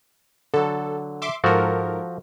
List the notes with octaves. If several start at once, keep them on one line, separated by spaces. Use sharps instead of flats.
D3 F#3 A4
E5 C6 D6
G#2 F3 F#4 A4 A#4